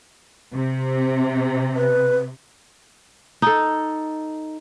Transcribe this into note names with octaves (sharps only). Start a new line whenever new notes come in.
C3
B4
D#4 A4